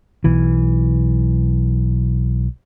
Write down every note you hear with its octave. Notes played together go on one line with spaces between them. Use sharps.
B1 E3